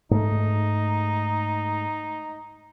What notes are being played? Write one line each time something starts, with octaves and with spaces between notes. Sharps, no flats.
G#2 A3 D#4